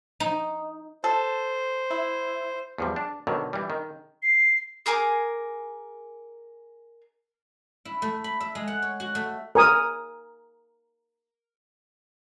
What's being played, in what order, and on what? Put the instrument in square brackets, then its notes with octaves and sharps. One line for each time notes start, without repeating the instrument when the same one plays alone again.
[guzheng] D#4
[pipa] A4 [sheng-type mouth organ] C5
[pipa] E4
[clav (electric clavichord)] E2 F3 G3
D4
B2 D3 D#3 F#3
E3 G3
D#3
[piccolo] C7
[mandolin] G#4 A#4 G#5 D6
[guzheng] E4
A3
B5
E5
G#3
F#5
C#5
F#4
A3
[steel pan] A#4 G#5 D#6